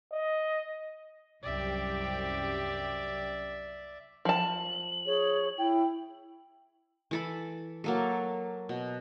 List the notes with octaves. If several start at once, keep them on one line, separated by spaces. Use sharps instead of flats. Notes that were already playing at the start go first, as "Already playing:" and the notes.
D#5
C2 F#2 G4 D5 E5
F3 A5 F#7
G#4 C#5
E4 G5
E3 A4 B5
F#3 A#3 A4
B2